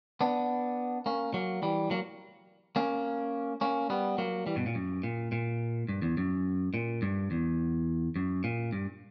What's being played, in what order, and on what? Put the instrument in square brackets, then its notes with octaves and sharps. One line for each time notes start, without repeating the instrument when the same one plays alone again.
[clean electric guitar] B3 D4
A#3 C#4
F#3 A#3
E3 G3
F#3 A#3
A#3 C#4
A#3 C#4
G3 B3
F#3 A#3
E3 G3
G2 B2
A#2
F#2
A#2
A#2
G2
E2
F#2
A#2
G2
E2
F#2
A#2
G2